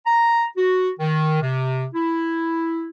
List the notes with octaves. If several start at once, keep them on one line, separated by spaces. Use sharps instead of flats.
A#5
F#4
D#3
C3
E4